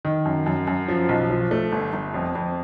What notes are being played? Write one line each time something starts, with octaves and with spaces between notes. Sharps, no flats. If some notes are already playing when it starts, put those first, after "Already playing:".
D#3
F#2
F#2
F#2
F3
B1
F3
A3
G1
G1
F2
F2